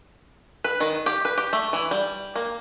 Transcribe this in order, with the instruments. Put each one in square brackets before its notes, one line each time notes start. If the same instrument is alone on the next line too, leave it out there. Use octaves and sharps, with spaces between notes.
[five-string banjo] B4
D#3
G4
B4
G4
A3
E3
G3
A#3